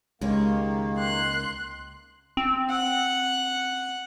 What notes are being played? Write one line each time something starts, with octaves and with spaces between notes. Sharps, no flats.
C#2 D#3 G#3 A#3 G4 C#5
C6 F#6
C4
F#5